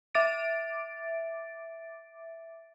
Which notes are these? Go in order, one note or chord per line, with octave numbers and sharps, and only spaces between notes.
E5 D6 A6 D7